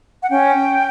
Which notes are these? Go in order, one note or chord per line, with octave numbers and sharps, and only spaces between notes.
F#5
C#4 G5